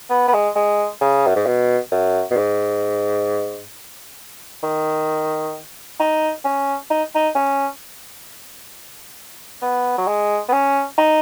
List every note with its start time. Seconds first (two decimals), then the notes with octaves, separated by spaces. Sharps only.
0.10 B3
0.28 B3
0.33 G#3
0.56 G#3
1.01 C#3
1.26 F#2
1.36 G#2
1.46 B2
1.92 F#2
2.31 B2
2.37 G#2
4.63 D#3
6.00 D#4
6.45 C#4
6.90 D#4
7.15 D#4
7.35 C#4
9.62 B3
9.98 F#3
10.07 G#3
10.49 B3
10.52 C#4
10.98 D#4